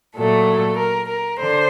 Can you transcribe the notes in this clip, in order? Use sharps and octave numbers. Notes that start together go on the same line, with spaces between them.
A#2 F#3 A3 A4
A#4
A#4
D3 C5